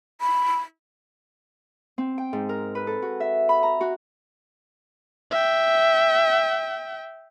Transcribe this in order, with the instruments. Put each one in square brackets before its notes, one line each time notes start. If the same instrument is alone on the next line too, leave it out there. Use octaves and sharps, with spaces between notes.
[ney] B5
[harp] C4
G5
G#2
A#4
B4
A4
F#4
E5
B5
A#5
F#4
[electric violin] E5 G5